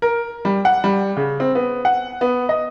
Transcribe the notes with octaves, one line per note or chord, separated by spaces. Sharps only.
A#4
G3
F#5
G3
C#3
C4
B3
F#5
B3
D#5